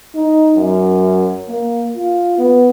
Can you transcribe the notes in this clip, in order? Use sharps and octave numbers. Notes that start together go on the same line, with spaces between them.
D#4
F#2
A#3
F4
B3